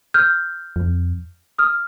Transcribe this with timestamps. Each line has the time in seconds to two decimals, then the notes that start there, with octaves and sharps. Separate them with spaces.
0.14 F6 G6
0.76 F2
1.58 D#6 F6